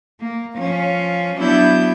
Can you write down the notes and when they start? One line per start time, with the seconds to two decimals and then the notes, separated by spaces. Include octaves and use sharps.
0.21 A#3
0.57 F3 C#4 F5
1.39 F#3 B3 D4 E4 E5 G6